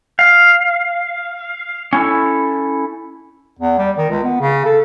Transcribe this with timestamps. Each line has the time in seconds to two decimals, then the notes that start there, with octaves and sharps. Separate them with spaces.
0.19 F5
1.93 C#4 E4 A4
3.59 E2
3.78 G3
3.98 D#3
4.09 C#2
4.23 B3
4.40 C#3
4.65 A4